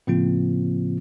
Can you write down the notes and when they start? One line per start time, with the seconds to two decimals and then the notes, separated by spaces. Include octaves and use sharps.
0.07 A2 C#3 F3 A#3 C4 F4